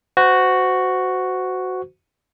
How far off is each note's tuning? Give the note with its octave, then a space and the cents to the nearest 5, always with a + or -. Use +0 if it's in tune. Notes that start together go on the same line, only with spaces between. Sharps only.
F#4 +0 C5 -30